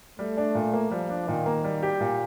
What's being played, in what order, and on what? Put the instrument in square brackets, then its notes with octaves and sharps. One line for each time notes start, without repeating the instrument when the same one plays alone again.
[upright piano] G3 [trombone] A3
[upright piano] D4
A#2
A#3
[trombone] F3 [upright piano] G3
[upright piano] D4
[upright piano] A#2 [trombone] D#3
[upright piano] A#3
G3
G4
A#2